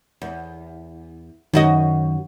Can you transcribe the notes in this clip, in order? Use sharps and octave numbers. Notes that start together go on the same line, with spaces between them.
E2
F#2 D#3 F#4 D#5